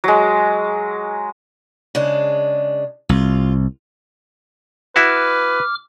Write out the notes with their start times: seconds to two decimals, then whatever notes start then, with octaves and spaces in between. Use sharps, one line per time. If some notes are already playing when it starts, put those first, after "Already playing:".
0.04 F#3 G#3
1.95 C#3 G#3 D4
3.09 C2 F4
4.96 E4 F#4 B4 D6 F6